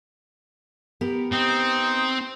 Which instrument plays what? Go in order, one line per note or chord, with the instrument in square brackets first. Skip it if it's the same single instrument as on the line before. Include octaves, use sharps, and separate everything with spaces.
[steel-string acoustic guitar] B3 G4 A#4
[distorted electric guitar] C4 [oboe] D#4